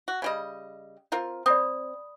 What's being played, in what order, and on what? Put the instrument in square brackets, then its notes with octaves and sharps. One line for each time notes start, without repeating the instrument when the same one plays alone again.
[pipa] F#4
C#3 G3 D#5
C4 F4 A#4
[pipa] C4 [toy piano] D5 B5 D#6